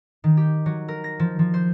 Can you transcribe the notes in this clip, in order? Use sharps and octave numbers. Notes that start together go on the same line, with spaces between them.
D#3
G4
F#3
A#4
A#6
F3
F3
C5